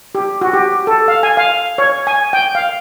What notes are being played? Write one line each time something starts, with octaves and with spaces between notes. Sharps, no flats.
G4
F#4
G4
A4
F5
G#5
F5
C#5
G#5
G5
F5